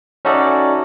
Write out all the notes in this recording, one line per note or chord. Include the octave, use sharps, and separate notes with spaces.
C#4 D#4 F#4 A4 D5 E5